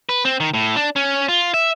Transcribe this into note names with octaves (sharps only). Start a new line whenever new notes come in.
B4
C4
D#3
A2
D4
C#4
F4
E5